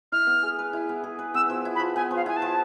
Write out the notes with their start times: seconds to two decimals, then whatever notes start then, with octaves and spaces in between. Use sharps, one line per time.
0.12 E4 F6
0.27 B3
0.43 G#4
0.59 B4
0.73 E4
0.89 B3
1.04 G#4
1.19 B4
1.34 B3 E6
1.50 F3
1.65 E4
1.75 B5
1.80 F3
1.96 B3 G#5
2.11 F3
2.16 F5
2.26 E4 G#5
2.36 A5
2.42 F3